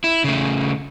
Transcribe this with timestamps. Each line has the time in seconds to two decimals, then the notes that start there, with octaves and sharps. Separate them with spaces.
0.04 E4
0.24 C#3 A3